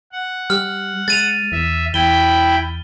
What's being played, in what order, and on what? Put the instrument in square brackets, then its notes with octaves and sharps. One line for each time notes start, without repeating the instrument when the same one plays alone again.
[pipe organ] F#5
[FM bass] G3 [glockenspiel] F6
[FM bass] G#3 [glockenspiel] A6 D#7 F7
[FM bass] E2 [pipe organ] E5
[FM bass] E2 [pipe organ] E4 G5 B5 [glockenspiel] G7